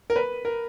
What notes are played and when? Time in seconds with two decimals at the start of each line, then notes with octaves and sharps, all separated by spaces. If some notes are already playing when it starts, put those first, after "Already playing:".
0.10 A#4
0.16 B4
0.45 A#4